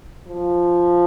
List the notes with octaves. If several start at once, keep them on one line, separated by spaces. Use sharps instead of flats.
F3